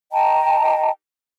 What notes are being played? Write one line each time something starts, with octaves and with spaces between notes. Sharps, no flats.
D#5 G5 A5 A#5